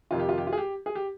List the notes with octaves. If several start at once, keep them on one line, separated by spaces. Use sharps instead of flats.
F2 C3 D#3 F4
G4
F4
G4
F4
G#4
G4
G#4
G4